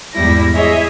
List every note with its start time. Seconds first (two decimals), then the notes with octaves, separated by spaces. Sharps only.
0.14 E2 G#2 G3 E4 A#6
0.53 E4 G#4 C#5 D#5 E5